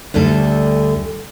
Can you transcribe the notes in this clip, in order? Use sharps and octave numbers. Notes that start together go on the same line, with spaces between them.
D2 D3 G3 A4